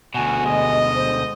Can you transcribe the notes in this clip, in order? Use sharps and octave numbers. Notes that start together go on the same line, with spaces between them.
D2 B2 F#4 G#5
G#3 D#5
C5